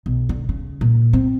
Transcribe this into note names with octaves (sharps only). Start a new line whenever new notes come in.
B1
D3
C#3
A#2
C4